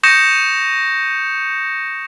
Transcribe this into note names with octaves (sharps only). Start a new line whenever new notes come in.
C#6 D#6 G6 A#6 C#7 E7